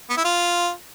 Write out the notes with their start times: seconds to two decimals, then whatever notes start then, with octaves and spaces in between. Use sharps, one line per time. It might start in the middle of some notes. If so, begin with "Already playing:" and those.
0.10 B3
0.17 E4
0.25 F4